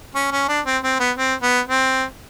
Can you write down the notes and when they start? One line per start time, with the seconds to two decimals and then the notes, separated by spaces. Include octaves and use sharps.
0.15 C#4
0.32 C#4
0.48 D4
0.66 C4
0.83 C4
1.00 B3
1.17 C4
1.42 B3
1.68 C4